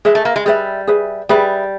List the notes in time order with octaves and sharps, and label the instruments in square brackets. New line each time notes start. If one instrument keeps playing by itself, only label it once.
[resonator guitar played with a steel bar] G#3 [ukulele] G#4 B4 E5
[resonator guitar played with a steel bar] A3
A#3
G#3
[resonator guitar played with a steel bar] G3 [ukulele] G#4 B4 E5
[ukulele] G#4 B4 E5
[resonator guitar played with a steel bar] G3 [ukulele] G#4 B4 E5